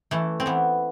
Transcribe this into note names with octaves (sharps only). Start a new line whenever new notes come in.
E3 A3
C4
E3 B3